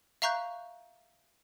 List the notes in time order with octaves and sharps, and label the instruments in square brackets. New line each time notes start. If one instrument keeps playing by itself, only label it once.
[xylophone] E5 F5 A#5 C#6 F#6 G6